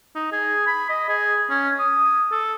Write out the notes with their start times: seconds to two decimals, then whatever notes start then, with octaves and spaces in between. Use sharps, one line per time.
0.15 D#4
0.32 G#4
0.67 B5
0.89 D#5
1.09 G#4
1.50 C#4
1.79 D#6
2.32 A4